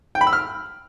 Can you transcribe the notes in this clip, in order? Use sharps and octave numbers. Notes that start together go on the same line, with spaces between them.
G5
B5
E6
F6